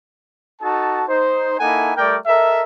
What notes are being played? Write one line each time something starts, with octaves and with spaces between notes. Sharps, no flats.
D#4 F#4 A4 A5
D#4 C5
A#3 D#4 E4 A4 F#5 G#5
G3 A3 A#4 D5 G5
A4 A#4 D#5 E5